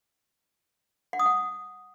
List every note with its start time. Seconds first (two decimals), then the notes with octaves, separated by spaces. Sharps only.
1.13 F#5
1.19 D#6
1.26 F#5